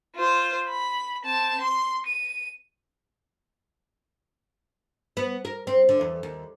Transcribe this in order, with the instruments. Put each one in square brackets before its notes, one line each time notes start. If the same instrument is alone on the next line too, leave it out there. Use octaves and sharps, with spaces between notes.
[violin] F4 C5
B5
C4 A5
C6
D#7
[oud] B3
A#4
C4
D3
E2
D#2